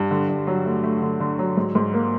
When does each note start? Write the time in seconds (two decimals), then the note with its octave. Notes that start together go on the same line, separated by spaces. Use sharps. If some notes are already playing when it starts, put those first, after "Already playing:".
Already playing: G2
0.11 D3
0.29 G2
0.47 F#3
0.65 A3
0.84 A3
1.02 D3
1.20 D3
1.39 F#3
1.57 G#2
1.75 G#2
1.94 A#3